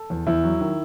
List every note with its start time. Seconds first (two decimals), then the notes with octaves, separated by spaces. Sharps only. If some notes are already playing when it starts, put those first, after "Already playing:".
Already playing: A4
0.10 E2
0.27 E2 E4
0.44 F#3
0.60 D#3